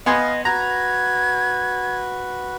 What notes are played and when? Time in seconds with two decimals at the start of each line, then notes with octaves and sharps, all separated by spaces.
0.06 B3 D#5 F5 G#5 C6
0.45 F#4 B4 A#5 G#6